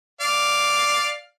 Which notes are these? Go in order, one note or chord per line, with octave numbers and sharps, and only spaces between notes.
D5 F5